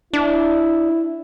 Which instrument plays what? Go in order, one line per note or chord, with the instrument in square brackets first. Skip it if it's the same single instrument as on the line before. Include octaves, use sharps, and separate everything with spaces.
[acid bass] D4 [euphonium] E4